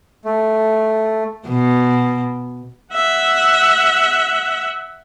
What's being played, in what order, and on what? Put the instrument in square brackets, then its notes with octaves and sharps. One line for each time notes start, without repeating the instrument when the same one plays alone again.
[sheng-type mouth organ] A3
[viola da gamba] B2
[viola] E5 F#5